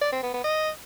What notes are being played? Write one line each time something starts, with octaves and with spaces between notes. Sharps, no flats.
D5
C4
B3
B3
D#5